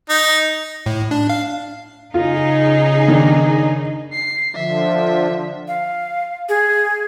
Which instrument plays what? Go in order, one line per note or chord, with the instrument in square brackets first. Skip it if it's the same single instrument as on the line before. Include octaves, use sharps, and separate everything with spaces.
[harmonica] D#4
[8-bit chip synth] A2
D4
F5
[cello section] C#3 D#4 G#4 [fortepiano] F4
[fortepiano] D#3 D4
[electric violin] C7
[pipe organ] D3 F3 [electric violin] E5
[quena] F5
G#4